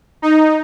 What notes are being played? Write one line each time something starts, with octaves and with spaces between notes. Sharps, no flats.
D#4